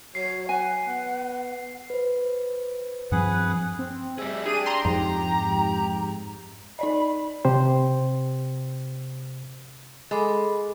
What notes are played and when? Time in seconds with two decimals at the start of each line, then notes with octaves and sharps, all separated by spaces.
0.15 F#3 C#5 C7
0.49 F#5 G#5
0.87 B3
1.90 B4 C5
3.12 G2 F3 C4 G#4 B4 F#5
3.79 C4
4.18 G3 G#4 E5
4.46 D4 G4 G#4 D#7
4.66 A#5 C6
4.85 F2 G#2 A#5
6.79 D#4 D5 D#5 B5
7.45 C3 G4 C5
10.11 G#3 A4 B5 D6